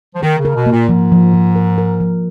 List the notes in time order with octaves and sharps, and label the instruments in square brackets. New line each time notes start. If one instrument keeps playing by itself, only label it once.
[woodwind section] F3
[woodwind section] D#3 [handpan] A#4
[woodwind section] C#3
[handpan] A#4
[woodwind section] B2
[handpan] A#3
[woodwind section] A#2
[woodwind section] G#2 [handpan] F3
[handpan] F3
F3
A#4
A#4
F3